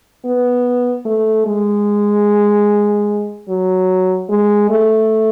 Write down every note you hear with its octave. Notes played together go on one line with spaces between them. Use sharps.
B3
A3
G#3
F#3
G#3
A3